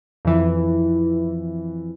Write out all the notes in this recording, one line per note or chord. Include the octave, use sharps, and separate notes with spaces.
F2 E3